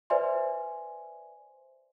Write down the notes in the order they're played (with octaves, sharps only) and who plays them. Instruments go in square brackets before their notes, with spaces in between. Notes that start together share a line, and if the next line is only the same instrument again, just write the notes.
[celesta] B4 C5 D5 E5 G#5 C6